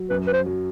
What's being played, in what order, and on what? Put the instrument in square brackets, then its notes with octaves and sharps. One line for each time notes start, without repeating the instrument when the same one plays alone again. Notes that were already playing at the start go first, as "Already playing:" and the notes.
Already playing: [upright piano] F#3
[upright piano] F#2 [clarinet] B4
[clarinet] B4
C5
[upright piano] F#3